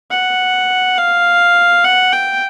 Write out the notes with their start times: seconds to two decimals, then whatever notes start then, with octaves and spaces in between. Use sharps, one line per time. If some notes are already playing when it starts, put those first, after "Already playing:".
0.11 F#5
0.97 F5
1.84 F#5
2.12 G5